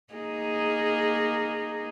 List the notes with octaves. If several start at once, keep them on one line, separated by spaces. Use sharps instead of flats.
A#3 D#4 G#4